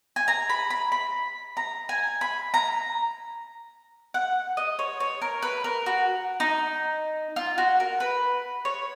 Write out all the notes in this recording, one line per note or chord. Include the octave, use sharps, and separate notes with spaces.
G#5
A#5
B5
B5
B5
A#5
G#5
B5
A#5
F#5
D#5
C#5
C#5
A#4
B4
A#4
F#4
D#4
F4
F#4
A#4
B4
C#5